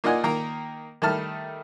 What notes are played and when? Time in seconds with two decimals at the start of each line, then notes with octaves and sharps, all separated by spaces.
0.04 A#3 F4 D5 D#5 F#5 G#5
0.24 D#3 A#3 A#4
1.02 D#3 G3 A3 A5 F6